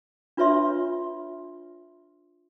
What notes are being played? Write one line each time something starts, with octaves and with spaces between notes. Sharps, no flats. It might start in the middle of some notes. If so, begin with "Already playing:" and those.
D4 F4 B4 C#5 E5 C6